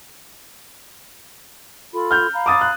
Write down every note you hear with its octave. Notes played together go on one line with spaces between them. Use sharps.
F4 A4 B5
F6 G6
F5 A#5 B5
D6 D#6 A6
F#6